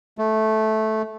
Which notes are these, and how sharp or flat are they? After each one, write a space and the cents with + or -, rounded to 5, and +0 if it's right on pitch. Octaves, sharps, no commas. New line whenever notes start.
A3 -10